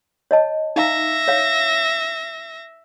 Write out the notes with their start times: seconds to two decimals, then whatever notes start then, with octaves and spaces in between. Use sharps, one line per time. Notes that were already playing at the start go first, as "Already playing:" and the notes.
0.31 C#5 D#5 A5
0.76 D#4 E5 F5 A#5 A#6
1.28 C#5 F5